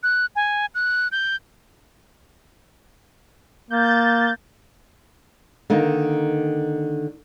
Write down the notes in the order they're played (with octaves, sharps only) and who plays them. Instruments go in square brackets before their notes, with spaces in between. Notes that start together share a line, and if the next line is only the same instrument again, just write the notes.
[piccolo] F#6
G#5
F#6
G6
[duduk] A#3 [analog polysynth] G6 A6
[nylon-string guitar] D3 D#3 A#3 D#4